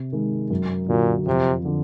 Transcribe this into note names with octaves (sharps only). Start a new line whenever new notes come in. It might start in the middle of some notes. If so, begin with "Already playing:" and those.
Already playing: C3
D#3 G#3
F#2
A#2 D3 F#3
F2 C3
D3 F3